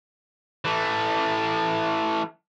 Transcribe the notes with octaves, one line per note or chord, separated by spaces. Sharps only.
E3 A3